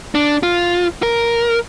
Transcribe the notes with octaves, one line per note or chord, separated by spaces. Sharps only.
D4
F4
A#4